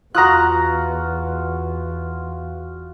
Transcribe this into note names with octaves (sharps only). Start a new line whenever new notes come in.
E2 F4 F#4 A#5 D#6 F#6